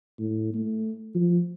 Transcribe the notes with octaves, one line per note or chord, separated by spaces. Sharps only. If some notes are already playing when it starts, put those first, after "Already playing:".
A2
A3
F3